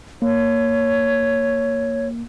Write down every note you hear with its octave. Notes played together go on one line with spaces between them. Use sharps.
A#3 C#5